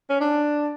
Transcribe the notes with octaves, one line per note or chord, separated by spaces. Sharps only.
C#4
D4